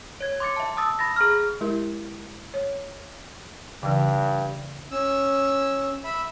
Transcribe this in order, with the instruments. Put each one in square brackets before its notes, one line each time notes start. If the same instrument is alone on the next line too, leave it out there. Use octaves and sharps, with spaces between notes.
[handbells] C#5 G#6
C6 D6 A6 C#7
E5 A5
A5 D#6 E6 A6
B5 A6 A#6
G#4 A#5 F6
[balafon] G#3 E4 G4 A#4
C#5
[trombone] G2 [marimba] C#3 E3
[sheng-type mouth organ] C#4 E6
E5 B5